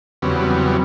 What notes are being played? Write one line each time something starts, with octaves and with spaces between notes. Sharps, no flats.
E2 C#3 F#3 G3 B3 C4